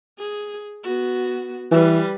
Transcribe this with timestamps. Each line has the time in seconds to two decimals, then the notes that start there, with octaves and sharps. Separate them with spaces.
0.18 G#4
0.83 B3 F#4
1.71 E3 G3 B4